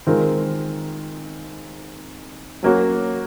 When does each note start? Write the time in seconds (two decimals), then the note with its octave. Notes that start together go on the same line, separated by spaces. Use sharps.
0.07 D#3 G#3 C4 F4 A#4
2.63 F#3 A#3 C#4 F#4